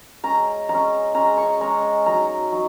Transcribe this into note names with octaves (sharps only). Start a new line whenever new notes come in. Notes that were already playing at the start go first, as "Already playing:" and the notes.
G#3 C#4 A#5
G#3 A#5
C#4
G#3 C#4 A#5
C#6
G#3 C#4 A#5
F#3 D#4 A#5
F#3 D#4